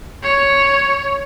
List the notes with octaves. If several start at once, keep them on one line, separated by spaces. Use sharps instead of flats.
C#5